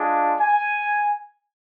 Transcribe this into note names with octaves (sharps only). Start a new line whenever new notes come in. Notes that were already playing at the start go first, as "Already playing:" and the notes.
Already playing: G#3 D4 F4
G#5